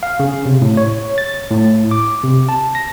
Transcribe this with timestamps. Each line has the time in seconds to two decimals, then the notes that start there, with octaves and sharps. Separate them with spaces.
0.03 F5
0.20 C#3
0.46 C3
0.62 A2
0.77 C#5
1.18 A6
1.51 A2
1.91 D6
2.23 C3
2.49 A5
2.75 A#6